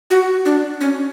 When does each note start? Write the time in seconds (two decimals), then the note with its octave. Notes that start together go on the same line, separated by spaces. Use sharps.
0.10 F#4
0.45 D4
0.81 C#4